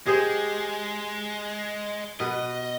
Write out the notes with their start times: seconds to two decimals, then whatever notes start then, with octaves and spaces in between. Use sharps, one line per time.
0.07 G#3 G4 G#4 C5
2.20 B2 B4 D#5